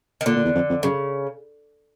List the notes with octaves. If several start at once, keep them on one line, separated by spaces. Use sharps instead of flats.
D#3
A#2 D3
A#2
E2
F2
F2
F#2 C#3